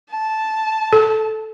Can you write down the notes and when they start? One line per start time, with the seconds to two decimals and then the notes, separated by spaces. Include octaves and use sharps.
0.11 A5
0.93 A4